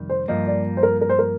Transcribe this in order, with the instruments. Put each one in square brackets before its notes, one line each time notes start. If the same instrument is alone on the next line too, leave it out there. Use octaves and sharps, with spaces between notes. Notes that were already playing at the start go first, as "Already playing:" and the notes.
Already playing: [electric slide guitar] F2 C3 D#3 G3
[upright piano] C5
[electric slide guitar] G2 F3 A#3 [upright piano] D#5
[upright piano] D5
C5
A#4
A#4
C5
A#4